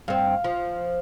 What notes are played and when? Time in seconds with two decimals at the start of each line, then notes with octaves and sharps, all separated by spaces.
0.08 G2 C4 F5
0.44 F3